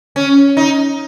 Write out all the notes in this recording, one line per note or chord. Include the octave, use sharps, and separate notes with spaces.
C#4
D#4